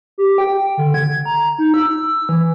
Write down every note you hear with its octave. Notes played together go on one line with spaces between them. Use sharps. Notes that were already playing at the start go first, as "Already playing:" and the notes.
G4
G5
D3
G#6
A#5
D#4
E6
E3